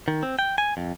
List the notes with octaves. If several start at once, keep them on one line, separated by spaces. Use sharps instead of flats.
D#3
C4
G5
G#5
F2